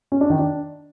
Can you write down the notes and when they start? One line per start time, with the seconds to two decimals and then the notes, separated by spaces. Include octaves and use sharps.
0.12 C#4
0.21 D4
0.30 D#3
0.39 D4